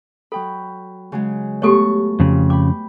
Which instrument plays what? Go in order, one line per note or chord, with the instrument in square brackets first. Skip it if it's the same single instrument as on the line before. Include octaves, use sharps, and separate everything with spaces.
[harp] F#3 G5 B5 [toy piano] A4
[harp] C#3 F#3 G#3
[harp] A3 B3 C#6 [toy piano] G4 A4 C#5
[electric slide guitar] F2 C#3
[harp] G5 B5 [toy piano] D6